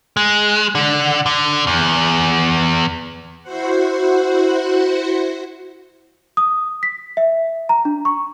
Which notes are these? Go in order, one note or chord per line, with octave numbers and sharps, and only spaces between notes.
G#3
D3
D3
E2
E4 F#4 C5 F#5
D#6
B6
E5
A#5
D4
C#6